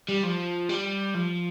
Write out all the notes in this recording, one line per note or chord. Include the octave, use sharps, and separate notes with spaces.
G3
F3
G3
F3